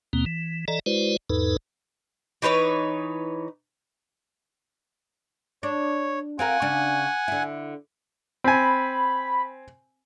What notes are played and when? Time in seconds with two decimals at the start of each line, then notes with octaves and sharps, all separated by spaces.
0.13 D#2 B2 A#3 C4
0.26 E3
0.68 E3 A4 D5 D#5 A#5
0.86 G#3 E4 F#4 B4 C5 D5
1.30 E2 G#2 D#4 A4 B4
2.42 E3 D#4 B4 C#5
5.63 D4 C#5
6.39 C4 F4 A#4 F#5 G#5
6.62 C#3 D4
7.28 D3 E4
8.44 C4 G#5 B5